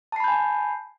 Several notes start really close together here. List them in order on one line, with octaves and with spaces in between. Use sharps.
A5 C7 B5 G6 G#5